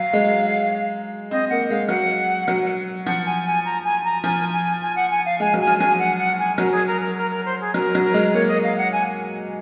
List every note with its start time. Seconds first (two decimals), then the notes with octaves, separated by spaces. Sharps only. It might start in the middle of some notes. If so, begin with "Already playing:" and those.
Already playing: F#3 F5
0.13 G#3
1.31 C4 D#5
1.50 A#3 F#5
1.70 G#3 F5
1.89 F#3 F#5
2.48 F#3
3.06 F3 F#5
3.26 G#5
3.46 G#5
3.65 A#5
3.84 G#5
4.04 A#5
4.24 F3 G#5
4.53 G#5
4.82 G#5
4.96 F#5
5.11 G#5
5.26 F5
5.40 G#3 G#5
5.54 F#3
5.60 G#5
5.67 F3
5.79 F#3 G#5
5.99 F#5
6.19 F#5
6.39 G#5
6.58 F#3 A#4
6.72 G#4
6.87 A#4
7.01 A#4
7.17 A#4
7.31 A#4
7.46 C5
7.61 G#4
7.74 F#3 A#4
7.95 F#3
8.04 A#4
8.14 G#3
8.33 A#3 C#5
8.48 D#5
8.63 F5
8.78 F#5
8.92 G#5